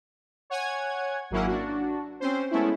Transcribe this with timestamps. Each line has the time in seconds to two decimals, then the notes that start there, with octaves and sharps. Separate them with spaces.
0.50 C#5 F#5 G#5 G#6
1.30 G#1 F#3 A#3 C#4 E4 F#5
1.47 D4 F#4
2.20 C4 C#4 C5
2.51 G#3 A3 B3 C#4 E4